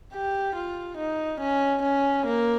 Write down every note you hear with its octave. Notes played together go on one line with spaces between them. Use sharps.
G4
F4
D#4
C#4
C#4
A#3